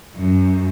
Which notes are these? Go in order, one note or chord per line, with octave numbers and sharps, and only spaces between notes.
F#2